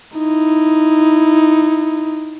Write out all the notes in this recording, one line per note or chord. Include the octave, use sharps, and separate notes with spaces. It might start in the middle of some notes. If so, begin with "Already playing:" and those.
D#4 E4